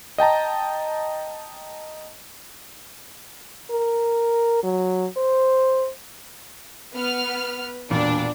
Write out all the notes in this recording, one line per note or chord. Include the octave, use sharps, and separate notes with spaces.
D#5 G5 A5 A#5
A#4
F#3
C5
B3 B4 F6
E1 A#2 D4 D5